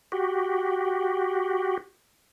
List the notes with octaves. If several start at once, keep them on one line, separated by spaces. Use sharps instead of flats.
F#4 G4